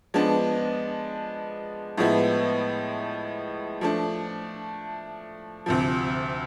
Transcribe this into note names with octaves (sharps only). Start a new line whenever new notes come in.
F3 G#3 B3 D4
A2 F3 G#3 B3 E4
F3 A3 D4
D2 C3 F3